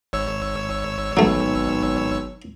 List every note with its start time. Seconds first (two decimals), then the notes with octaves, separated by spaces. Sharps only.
0.13 G#1 C#5 E6
1.17 B1 F#3 A3